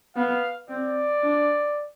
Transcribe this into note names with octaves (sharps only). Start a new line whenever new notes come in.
B3 F5
C4 D5
D4